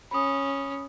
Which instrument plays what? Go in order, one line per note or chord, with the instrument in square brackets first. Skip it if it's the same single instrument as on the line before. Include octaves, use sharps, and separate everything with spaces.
[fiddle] C#4 [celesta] B5 D#6